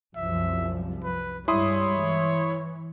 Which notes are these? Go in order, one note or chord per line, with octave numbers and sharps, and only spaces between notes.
C2 F#2 F3 E5
B4
G2 G3 G#3 E4 C#5 C6 D#6
E3